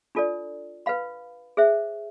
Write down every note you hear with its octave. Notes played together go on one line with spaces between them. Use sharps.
D4 F4 A4 D5
B4 F5 B5
G#4 C5 E5